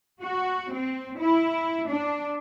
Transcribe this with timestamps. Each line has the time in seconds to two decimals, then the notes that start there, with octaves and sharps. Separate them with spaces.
0.21 F#4
0.73 C4
1.19 E4
1.89 D4